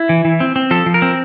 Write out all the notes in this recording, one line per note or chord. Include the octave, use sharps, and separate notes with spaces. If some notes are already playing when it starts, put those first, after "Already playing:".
Already playing: E4
E3
E3
C4
C4
F3 A4
F3
A#4
C4